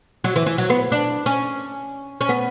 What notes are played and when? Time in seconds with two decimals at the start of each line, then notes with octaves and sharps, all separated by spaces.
0.24 F#3
0.36 E3
0.46 E3
0.58 F#3
0.70 B3
0.92 D4
1.26 C#4
2.21 C#4
2.29 B3